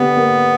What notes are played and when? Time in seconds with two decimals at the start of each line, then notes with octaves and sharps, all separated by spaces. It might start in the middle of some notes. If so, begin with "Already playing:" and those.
Already playing: D3 B3 G4
0.17 A#3